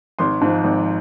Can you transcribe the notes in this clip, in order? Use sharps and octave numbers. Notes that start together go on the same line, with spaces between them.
G#1 C6
G#2 F3
G#1